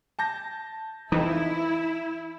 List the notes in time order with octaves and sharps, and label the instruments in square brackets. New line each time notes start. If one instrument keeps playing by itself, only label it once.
[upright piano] A5 G6 A#6
[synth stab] F2 D#4 [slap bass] E3 [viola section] E4